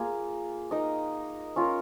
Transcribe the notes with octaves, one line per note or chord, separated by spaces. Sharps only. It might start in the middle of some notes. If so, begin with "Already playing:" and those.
Already playing: A#3 F4 G#4
D#4 A#4 D#5
C#4 F4 A#4